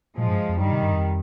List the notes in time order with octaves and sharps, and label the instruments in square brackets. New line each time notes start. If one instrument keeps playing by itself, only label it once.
[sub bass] A#2 [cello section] F3 G#3
[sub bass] G2
F2
[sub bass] G2 [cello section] D#3 G3
[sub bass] C3
G2
F2